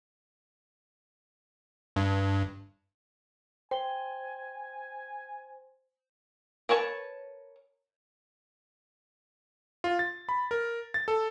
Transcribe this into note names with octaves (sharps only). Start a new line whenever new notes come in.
G2
C5 G5 G#5 G7
A#4 B4 C#5 A5
F4
A6
B5
A#4
A6
A4